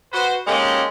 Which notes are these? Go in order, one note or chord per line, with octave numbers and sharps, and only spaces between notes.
F#4 B4 C5
G#3 A#3 C#4 D#4 G4 A4